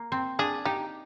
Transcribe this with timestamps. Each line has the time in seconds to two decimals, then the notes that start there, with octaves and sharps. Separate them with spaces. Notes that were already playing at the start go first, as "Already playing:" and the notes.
Already playing: A#3
0.12 C4
0.39 D4 G#4
0.65 D#4 G4